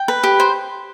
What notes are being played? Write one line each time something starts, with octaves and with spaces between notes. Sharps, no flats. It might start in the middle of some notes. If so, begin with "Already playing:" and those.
Already playing: G5
B4
G4
C5